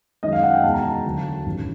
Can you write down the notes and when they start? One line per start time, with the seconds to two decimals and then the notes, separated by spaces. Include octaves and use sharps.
0.23 F#2 D#3 G#3 D#5
0.32 F5
0.43 F#5
0.54 G5
0.63 E2 B2 G#3 A5
0.74 A#5
0.83 A5
1.05 D2 D3 F#3
1.46 A1 G2 D#3